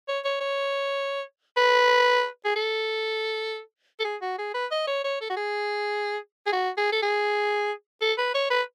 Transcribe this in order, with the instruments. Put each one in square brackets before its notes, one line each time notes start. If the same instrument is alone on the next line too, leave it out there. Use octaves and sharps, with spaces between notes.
[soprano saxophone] C#5
C#5
C#5
B4
G#4
A4
A4
G#4
F#4
G#4
B4
D#5
C#5
C#5
A4
F#4
G#4
G#4
F#4
G#4
A4
G#4
A4
B4
C#5
B4